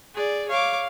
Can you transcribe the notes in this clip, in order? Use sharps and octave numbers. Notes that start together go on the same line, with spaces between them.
G#4 D5
C#5 F5 D6